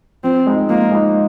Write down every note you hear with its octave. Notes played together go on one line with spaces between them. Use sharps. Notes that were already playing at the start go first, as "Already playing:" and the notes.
F3 C4
G#3 D#4
F3 A#3
G#3 D#4